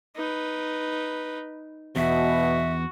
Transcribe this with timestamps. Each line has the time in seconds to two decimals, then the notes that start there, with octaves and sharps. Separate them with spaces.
0.16 D#4 B4
1.96 E2 B2 F#4 E5